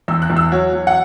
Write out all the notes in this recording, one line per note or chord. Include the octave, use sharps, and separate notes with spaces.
E2 E6
F#6
E2
E6
F#3 C#5
F#3
F#5